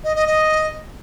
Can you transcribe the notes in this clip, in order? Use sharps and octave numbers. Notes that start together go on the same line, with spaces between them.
D#5
D#5
D#5